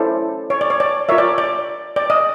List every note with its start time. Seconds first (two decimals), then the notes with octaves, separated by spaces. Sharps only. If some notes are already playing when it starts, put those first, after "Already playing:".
Already playing: C#4 E4 A4 C5 D5
0.50 C#5
0.61 D5
0.70 C#5
0.80 D5
1.09 F4 A#4 C#5 E5
1.18 D5
1.38 D5
1.96 D5
2.10 D#5